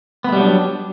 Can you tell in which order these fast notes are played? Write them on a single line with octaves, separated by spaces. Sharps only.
B3 A3 G3 F#3 D4